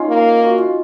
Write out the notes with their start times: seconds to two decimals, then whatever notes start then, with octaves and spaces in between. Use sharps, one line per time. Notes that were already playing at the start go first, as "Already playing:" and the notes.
Already playing: C#4 D#4 F4
0.09 A#3
0.45 F#4
0.58 F4